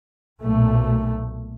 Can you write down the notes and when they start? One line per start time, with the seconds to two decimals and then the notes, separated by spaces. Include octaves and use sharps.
0.41 B1 A#2 A3